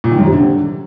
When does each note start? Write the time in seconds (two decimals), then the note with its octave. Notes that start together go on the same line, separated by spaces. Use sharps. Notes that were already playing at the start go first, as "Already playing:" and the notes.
0.04 A#2
0.11 D#3
0.18 F#2
0.26 C3
0.33 D3